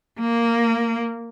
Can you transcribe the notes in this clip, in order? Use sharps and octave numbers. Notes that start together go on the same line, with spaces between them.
A#3